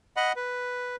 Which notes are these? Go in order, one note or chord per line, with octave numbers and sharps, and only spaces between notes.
D#5 F#5 B5
B4